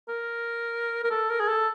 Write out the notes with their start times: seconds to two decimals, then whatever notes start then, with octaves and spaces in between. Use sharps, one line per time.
0.09 A#4
1.04 A#4
1.11 A4
1.30 A#4
1.40 G#4
1.48 A4